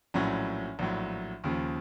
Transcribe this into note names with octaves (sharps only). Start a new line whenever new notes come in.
A#1 A2 F#3 C#4
A#1 A2 F#3
D#2 C#3 F3